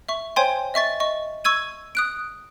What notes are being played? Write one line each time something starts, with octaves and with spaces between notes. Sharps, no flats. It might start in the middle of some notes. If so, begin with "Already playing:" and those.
E5 C#6
C5 C#5 G5 G#5 C6
D#5 E5 C#6 A6
D#5 C#6
C#6 E6 G#6 D#7
D#6 F#6 D7